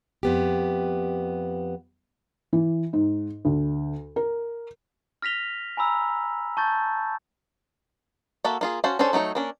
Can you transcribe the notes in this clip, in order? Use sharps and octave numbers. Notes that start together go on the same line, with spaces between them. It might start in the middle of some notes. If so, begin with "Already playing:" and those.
F2 B3 G4
E3
G#2
D2
A#4
F6 A#6 B6 F7 G7
G#5 A#5 B5 E6
A5 C#6 G6 A6
A#3 F#4 A4 E5
A#3 F4 G#4
C#4 F#4 C5 F5 A5
C#4 D4 G#4 A4 C5
F#3 A3 D#4 C#5
A#3 C#4 D4